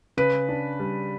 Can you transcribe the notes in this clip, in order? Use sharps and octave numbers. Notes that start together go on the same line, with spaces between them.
C#3 B4
D4
G3